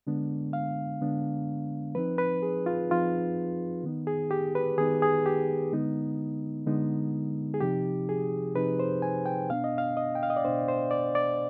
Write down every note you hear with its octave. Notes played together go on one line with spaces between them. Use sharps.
D3 G#3 B3 D4
F5
D3 G#3 B3 D4
F3 C4 D#4 B4
B4
G#4
F4
F3 C4 D#4 F4
D#3 B3 D#4
G#4
G4
B4
D#3 B3 D#4 G#4
G#4
G4
D3 G#3 B3 D#4
D3 G#3 B3 D#4
G#4
C3 F3 C4 D#4 G4
G#4
C3 F3 C4 D#4 B4
C5
G#5
G5
B2 B3 D4 F5
D#5
F5
D#5
G5
F5
D#5
D5
B2 B3 D4 C5
C5
D5
D5